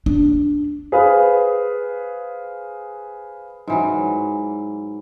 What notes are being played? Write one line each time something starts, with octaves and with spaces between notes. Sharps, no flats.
D4
G#4 B4 C5 F5 B5
G#2 E3 F#3